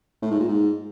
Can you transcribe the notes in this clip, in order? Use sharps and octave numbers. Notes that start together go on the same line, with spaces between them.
A2
G#2
A#2
G#2